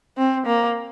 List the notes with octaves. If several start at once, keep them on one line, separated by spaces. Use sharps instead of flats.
C4
A#3